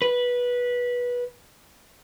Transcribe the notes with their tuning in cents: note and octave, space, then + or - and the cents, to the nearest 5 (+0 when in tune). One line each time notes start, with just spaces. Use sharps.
B4 -15